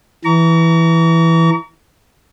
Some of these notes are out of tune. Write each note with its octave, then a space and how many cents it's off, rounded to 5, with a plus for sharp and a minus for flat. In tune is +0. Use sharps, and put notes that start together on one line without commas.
E3 +0 A#5 -10 C#6 +45